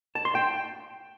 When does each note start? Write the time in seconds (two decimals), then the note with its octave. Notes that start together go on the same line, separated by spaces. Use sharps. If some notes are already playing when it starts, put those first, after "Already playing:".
0.15 A5
0.25 C6
0.35 G5